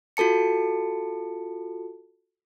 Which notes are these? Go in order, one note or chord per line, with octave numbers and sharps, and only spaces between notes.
F4 F#4 A4 A5 C#7